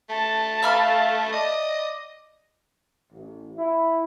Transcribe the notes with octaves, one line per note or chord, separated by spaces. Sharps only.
A3 A5
E5 F5 B5 F6
D5 D#5
A1
E4